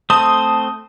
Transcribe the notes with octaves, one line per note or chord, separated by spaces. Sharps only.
A3 C4 C5 A5 D#6